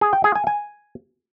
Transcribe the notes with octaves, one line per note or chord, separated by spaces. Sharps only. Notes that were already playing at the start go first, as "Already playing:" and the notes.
G#4
G5
G#4
G#5
G#5